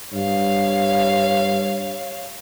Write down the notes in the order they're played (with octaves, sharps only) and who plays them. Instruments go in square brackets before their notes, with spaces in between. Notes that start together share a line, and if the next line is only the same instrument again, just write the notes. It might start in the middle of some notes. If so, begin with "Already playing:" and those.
[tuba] G2 [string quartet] C#5 F5